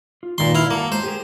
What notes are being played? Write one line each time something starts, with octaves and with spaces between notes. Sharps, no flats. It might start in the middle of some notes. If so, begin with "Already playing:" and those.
F4
A#2 D#3 B4 C6
E4 F5
A#3 F#4 F#5 A5
G#3 C5
G4 G#4 A#4